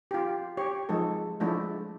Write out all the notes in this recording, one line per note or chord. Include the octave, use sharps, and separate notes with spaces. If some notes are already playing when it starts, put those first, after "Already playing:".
F4 G4
G4 C#5
F3 G#3 D#4 A4
F3 G#3 A3 D4 E4